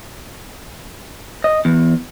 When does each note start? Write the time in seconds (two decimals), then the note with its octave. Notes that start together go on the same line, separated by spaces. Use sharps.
1.44 D#5
1.65 E2